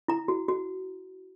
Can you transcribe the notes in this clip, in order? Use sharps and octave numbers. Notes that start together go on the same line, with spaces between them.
E4 A#5
F#4
F#4